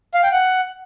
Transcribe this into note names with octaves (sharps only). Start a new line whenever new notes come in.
F5
G5
F#5